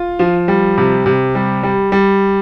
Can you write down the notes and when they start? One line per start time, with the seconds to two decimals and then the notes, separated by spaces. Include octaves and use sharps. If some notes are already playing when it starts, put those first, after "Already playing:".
Already playing: F4
0.19 F3
0.48 G3
0.78 C3
1.06 C3
1.35 G3
1.63 G3
1.92 G3